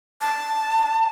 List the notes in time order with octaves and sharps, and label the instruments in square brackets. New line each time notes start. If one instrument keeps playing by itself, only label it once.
[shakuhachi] A5